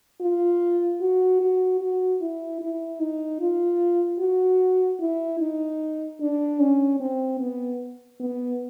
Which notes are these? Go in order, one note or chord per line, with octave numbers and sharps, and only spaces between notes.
F4
F#4
F#4
F#4
E4
E4
D#4
F4
F#4
E4
D#4
D4
C#4
C4
B3
B3